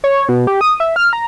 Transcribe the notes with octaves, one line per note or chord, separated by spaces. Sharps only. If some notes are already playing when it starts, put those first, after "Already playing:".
C#5
B2
G4
D#6
E5
F6
A#5